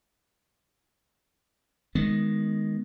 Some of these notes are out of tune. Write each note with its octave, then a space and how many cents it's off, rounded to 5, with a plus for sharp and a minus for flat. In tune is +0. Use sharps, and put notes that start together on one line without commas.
D#3 +0 G#3 +0 B3 +0